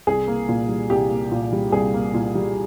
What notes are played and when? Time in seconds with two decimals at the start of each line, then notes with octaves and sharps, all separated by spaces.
0.07 C2 G#4
0.27 A#3
0.49 A#2
0.69 G3
0.90 C2 G4
1.10 A#3
1.32 A#2
1.52 G3
1.72 C2 G#4
1.94 A#3
2.14 A#2
2.35 G3